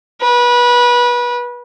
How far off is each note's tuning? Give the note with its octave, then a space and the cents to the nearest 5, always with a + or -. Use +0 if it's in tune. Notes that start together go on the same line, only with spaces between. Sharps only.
B4 -25